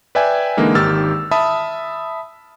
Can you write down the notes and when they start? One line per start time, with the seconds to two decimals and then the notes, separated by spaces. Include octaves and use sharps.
0.15 B4 D5 E5 G5 G#5
0.57 D3 E3 G#3 A#3 D#4
0.75 G#1 D#3 G4 E6 F6 A6
1.31 E5 A5 B5 D#6